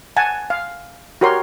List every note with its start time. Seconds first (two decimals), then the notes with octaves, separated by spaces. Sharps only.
0.17 F#5 G#5 A5
0.50 F5
1.21 F#4 G4 A#4 C#5 C6